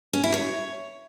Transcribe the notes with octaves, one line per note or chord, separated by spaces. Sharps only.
C#4
E4
C#5